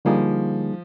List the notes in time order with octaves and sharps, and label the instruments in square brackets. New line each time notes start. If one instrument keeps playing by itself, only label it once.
[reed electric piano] D3 G3 A#3 D#4 G#4 [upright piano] F3